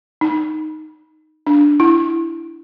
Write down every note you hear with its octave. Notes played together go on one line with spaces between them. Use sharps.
D#4
D4
E4